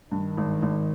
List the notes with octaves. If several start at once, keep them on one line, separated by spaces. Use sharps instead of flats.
G2 D#3
G#1
G#1